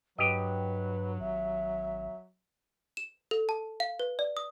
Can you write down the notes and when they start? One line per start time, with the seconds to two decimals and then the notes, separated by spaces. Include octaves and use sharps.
0.18 G2 F#3 G4 B4 D#5
1.20 G#1 E5
2.97 E7
3.31 A4
3.49 A5
3.80 F5
4.00 B4
4.19 D5
4.37 D#6